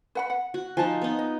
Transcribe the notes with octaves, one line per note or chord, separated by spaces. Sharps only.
B4 F#5 B5
F#5
F#4
F3 D#4 G#5 A5
B3 D#4
D#5